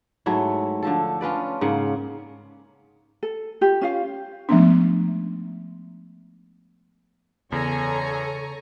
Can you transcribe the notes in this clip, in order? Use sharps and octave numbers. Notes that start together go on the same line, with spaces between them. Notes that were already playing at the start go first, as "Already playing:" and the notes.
G#2 F#3 A3 E4
D3 F3 A4
C#4 F4 B4 D5
G#2 C#3 A#3 F#5
A4
F4 G4
C#4 F4 F5
F3 G#3 A3 B3 C#4 D4
E2 C#3 A4 C#5 G#5 A#5 C#6